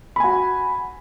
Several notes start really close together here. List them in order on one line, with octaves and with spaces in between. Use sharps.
B5 G#5 F#4